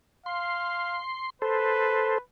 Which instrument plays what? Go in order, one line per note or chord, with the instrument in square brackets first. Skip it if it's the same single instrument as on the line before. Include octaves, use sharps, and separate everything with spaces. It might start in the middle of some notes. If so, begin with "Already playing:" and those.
[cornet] F5 [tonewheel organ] C6
[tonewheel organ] A4 C5 [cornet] B4